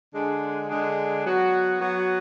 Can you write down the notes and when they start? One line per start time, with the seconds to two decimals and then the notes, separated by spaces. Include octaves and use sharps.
0.13 D3 G#3 D4 G#4
0.69 D3 G#3 D4 G#4
1.25 F#3 B3 F#4
1.80 F#3 B3 F#4